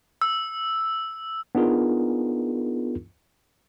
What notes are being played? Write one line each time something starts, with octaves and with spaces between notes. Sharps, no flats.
E6
B3 D4 D#4 F4 G#4 A#4